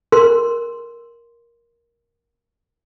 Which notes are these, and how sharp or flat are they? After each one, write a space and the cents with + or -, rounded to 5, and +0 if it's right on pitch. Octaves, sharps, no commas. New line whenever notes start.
A#4 +10 C6 +0